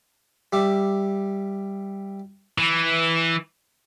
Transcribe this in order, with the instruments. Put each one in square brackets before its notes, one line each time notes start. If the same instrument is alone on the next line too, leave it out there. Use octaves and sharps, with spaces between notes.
[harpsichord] G3 E5 D6
[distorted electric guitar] E3